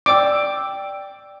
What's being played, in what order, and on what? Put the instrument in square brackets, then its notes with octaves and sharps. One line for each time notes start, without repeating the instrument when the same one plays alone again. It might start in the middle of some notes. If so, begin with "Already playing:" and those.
[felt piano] D5 G5 E6 [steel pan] D6